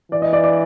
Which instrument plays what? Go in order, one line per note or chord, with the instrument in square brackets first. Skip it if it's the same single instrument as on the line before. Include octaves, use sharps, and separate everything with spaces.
[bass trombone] E3 [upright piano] D5
[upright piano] D#5
D5
D5